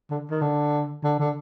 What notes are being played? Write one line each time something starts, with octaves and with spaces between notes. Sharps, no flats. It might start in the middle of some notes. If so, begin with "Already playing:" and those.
D3
D#3
D3
D3
D3